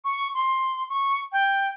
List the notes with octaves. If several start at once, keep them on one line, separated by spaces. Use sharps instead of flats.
C#6
C6
C#6
G5